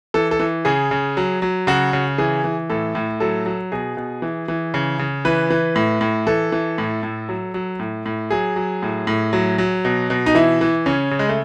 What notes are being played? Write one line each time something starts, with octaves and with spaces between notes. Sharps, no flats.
E3 A4
A4
E3
C#3 G#4
C#3
F#3
F#3
C#3 F#4
C#3
E3 G#4
E3
A2 A4
A2
F#3 A4
F#3
B2 G#4
B2
E3
E3
C#3
C#3
E3 B4
E3
A2
A2
E3 A4
E3
A2
A2
F#3
F#3
A2
A2
F#3 G#4
F#3
A2
A2
F#3
F#3
B2
B2
D#4
E3 E4
E3
C#3 C#4
C#3
G#3
A3